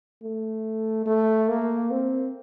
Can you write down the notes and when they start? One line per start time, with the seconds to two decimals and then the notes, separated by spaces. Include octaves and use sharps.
0.23 A3
1.06 A3
1.49 A#3
1.91 C4